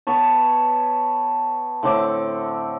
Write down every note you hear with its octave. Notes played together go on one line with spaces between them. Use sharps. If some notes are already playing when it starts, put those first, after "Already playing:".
B3 B4 C#5 A5
A2 D3 C4 D6